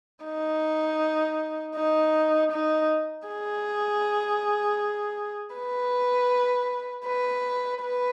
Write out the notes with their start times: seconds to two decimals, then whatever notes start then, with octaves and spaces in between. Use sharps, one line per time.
0.24 D#4
1.75 D#4
2.52 D#4
3.27 G#4
5.55 B4
7.06 B4
7.81 B4